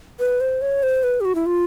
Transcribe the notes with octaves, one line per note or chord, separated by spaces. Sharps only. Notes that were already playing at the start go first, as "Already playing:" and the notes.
B4
C5
C#5
C5
B4
G4
F#4
E4
F4